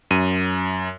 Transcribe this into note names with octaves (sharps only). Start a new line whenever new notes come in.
F#2 D#7